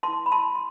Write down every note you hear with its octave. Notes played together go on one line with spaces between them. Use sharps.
E4 B4 A5 C6
B5
A5 C6
C6